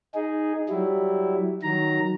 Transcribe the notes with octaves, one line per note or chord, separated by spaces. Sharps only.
D#4 G#4
F#3 G3 E4
D#3 F#3 A#5